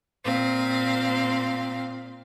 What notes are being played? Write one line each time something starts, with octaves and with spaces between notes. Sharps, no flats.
A#2 C4 F5